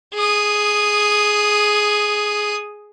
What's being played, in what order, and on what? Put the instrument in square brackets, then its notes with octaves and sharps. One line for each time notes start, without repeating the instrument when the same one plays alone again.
[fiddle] G#4 D#6